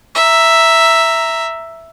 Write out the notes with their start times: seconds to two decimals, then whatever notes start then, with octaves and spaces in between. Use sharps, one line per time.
0.15 E5 A#5